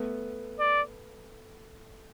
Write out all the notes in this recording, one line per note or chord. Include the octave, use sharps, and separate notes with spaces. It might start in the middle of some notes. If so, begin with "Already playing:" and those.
Already playing: A3 B3
D5